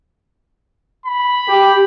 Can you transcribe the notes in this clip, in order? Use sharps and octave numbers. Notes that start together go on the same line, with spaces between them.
B5
G4